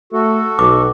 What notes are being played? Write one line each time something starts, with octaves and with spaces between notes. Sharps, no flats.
A3 F#4 A4
B1 D6